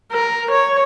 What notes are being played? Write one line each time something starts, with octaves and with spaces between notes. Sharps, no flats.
A#4
C#5